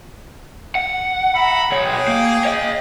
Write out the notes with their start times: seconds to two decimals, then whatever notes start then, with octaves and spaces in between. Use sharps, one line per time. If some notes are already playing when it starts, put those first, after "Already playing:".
0.75 F#5
1.35 E5 A#5 B5
1.71 B1 G#4 C#5 G5
2.08 A#3
2.45 C#5 D#5